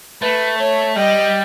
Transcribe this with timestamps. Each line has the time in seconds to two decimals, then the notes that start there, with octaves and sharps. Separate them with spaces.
0.22 A3 B4
0.59 C#5
0.96 G3 D#5